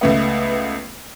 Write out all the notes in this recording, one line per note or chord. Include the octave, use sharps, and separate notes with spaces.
C#2 A3 B3